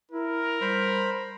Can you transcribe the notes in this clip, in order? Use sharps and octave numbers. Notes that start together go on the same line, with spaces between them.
E4 A#4
G3 C5 B5